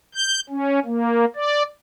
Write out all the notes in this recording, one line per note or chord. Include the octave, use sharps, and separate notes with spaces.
G6
C#4
A#3
D5